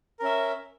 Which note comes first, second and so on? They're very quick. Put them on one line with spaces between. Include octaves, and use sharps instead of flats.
A#4 C#4 E5